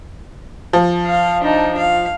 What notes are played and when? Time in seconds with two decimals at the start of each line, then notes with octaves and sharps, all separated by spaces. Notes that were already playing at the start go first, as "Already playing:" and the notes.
0.73 F3
1.05 F5
1.42 D4 D#4
1.78 F5